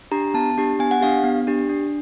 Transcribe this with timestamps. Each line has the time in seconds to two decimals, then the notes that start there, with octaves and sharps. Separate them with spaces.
0.11 D4 G4 A#5
0.34 B3 A5
0.58 D4 G4
0.79 B3 G#5
0.91 F#5
1.01 D4 G4 F5
1.24 B3
1.47 D4 G4
1.69 D4